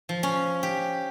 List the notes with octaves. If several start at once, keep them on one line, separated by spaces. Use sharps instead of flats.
F3
C#4
G4